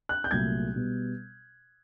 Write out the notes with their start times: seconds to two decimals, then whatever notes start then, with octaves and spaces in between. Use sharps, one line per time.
0.09 F#6
0.24 G6
0.31 C2 A#2 F#3 A3 G#6
0.76 B2 G3 B3